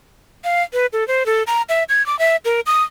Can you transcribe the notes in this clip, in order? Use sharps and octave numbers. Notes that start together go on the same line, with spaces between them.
F5
B4
A4
C5
A4
A#5
E5
G#6
D6
E5
A#4
D#6